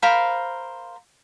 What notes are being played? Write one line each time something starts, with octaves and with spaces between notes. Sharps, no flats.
A#4 C5 F5 B5